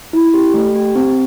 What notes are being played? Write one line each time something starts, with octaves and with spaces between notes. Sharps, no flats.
E4
G4
A3
G4
C4